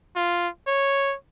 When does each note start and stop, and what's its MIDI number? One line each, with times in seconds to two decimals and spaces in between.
0.16 0.48 65
0.67 1.15 73